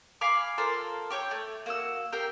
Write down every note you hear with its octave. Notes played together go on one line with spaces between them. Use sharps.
F5 G#5 B5 D6
F4 A4 A#4 C5
G4 C#5 G5
A3
A#3 F#4 E6
G4 A#4 F5 G5